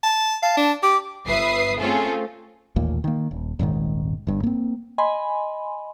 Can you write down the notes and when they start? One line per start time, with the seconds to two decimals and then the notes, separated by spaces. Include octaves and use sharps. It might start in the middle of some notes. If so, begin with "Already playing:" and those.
0.03 A5
0.43 F5 A5
0.57 D4
0.83 G4 D6
1.26 G1 B4 E5 D#6 C7
1.78 A3 C4 C#4 F4 G#4 A4
2.76 A1 D#2 A#2 A#3
3.04 D#3 A#3
3.31 D#1
3.59 D#1 G#1 G#2 D#3
4.27 G1 G2
4.43 A#3 C4
4.98 D#5 G#5 B5 C6